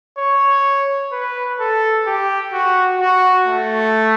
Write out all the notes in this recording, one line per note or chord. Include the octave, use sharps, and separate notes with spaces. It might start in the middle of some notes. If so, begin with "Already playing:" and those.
C#5
B4
A4
G4
F#4
F#4
A3